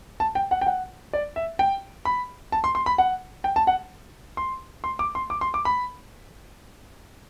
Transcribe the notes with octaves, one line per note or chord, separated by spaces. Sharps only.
A5
G5
F#5
G5
F#5
D5
E5
G5
B5
A5
C6
C6
B5
F#5
G5
A5
F#5
C6
C6
D6
C6
D6
C6
D6
B5